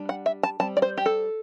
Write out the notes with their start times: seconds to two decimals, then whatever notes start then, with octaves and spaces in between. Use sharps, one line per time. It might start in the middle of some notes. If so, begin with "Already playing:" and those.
Already playing: G3 D4
0.09 F#5
0.26 E5
0.43 A5
0.60 G3 C4 A5
0.77 D5
0.82 C5
0.98 G4
1.06 A4